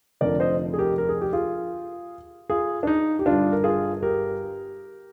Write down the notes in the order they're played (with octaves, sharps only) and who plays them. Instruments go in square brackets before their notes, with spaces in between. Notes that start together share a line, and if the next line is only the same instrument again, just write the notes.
[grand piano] F1 F2 D3 F3 A#4 D5
C5 D#5
G#4
G4 A#4
A#4
G#4
G4
F4 G#4
F4 G#4
D4
D#4
G4
G1 G2 D3 D4 F4
A#4
F4 G#4
G4 A#4